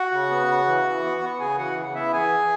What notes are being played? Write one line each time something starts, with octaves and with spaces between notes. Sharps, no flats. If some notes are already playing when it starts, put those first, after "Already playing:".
Already playing: F#4 F#5
C#3
B3
C#3
E3
E3
B3
B3
C#3 G#4 G#5
E3 F#4 F#5
C#3
B3 E4 E5
E3 G#4 G#5